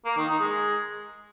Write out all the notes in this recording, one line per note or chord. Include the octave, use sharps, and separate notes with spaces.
A#3
D#3
D#4
G#3